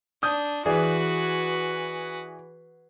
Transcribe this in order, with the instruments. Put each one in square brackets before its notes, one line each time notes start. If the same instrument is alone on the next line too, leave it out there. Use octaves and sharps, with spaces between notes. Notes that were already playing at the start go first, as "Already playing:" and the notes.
[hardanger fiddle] D4 [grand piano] D#6 G6
[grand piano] E3 G#4 D5 [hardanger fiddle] F#4 B4